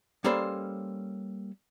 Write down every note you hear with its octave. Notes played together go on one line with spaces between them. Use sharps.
G3 A#3 C#4 A4 C5 B5